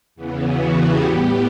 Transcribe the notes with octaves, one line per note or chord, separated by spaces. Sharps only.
E2 C#3 E3 B3
F#4
G4
A2 G3 B3 G4